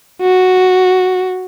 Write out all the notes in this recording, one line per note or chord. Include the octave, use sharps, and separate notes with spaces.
F#4